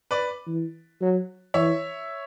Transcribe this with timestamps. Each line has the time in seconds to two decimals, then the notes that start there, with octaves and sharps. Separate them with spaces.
0.11 B4 D5
0.47 E3
1.01 F#3
1.54 E3 C#5 E5